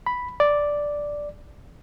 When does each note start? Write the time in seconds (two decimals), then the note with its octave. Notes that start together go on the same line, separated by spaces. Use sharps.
0.07 B5
0.40 D5